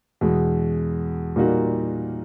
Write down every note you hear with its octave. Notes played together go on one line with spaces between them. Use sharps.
E2 B2 G#3
A#2 G3 A#3 D#4 F#4